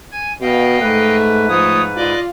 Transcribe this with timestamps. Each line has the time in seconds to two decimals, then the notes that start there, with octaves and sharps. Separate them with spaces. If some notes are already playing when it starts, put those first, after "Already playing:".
0.11 G#5 G#6
0.41 B2 D#5 F5 G5
0.81 G#2 A3 B4
1.49 F3 A3 C#5 D#6
1.96 F4 D5 D#5 D6